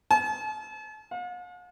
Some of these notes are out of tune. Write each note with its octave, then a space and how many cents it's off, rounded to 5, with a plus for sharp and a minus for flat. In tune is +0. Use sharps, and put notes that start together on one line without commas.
A5 -45
F5 +45